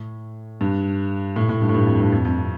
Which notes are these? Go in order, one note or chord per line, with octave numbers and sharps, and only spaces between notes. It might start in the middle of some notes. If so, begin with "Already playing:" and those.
Already playing: A2
G2
A2
A2
G2
A2
G2
F2
G2
F2
F2